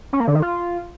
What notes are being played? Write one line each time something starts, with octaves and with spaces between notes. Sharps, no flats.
C#4
A#3
D3
D#3
F4